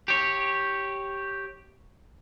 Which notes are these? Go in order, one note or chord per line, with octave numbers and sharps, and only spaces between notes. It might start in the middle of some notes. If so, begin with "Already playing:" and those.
G4 C#5